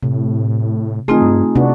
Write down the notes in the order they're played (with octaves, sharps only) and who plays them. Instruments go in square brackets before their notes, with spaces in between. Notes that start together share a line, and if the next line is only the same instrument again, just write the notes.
[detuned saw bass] A2 [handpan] C3
[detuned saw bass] D#3 [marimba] A3 C4 F4 [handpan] D#4 G#4
[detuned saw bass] G2
[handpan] C3 D4 F#4 [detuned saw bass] B3